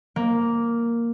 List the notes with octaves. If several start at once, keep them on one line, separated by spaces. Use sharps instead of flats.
A#3